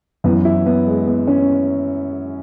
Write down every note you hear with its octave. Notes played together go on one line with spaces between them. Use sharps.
F#2 E3 B3
E4
B3
G#3
B3
C#4